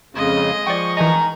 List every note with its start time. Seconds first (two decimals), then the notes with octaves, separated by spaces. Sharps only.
0.15 F2 C#3 G#3 D#5
0.67 F3 D5 G5 C#6
0.97 D#3 E3 D#5 G#5 A#5